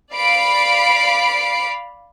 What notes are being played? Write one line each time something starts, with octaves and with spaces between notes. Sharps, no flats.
D5 F5 B5 C7 D7